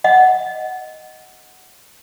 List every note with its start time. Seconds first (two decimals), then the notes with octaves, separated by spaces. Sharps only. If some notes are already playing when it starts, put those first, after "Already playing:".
0.04 D#5 F#5